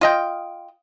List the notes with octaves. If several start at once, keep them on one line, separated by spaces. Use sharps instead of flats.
F4 D#5 G5